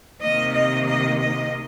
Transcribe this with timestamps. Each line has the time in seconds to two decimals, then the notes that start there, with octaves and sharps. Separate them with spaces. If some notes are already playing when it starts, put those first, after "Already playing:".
0.22 C3 D#3 A#3 D#5
0.54 D#5
0.86 D#5
1.18 D#5